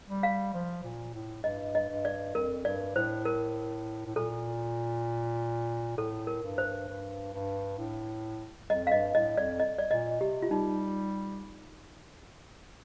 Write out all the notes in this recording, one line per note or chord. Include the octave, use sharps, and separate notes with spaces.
G3
F5
F3
A#2
A2
G2 D#5
D#5
G2
D5
F2 A#4
G2 D5
A2 C5
A#4
A2
A#2 A4
A2 A4
A#4
G2
C5
G2
G2
A2
F2 D#5
F5
G2 D#5
A2 D#5
F2 D5
D#5
D5
A#2 D#5
C3 G4
F4
G3 D#4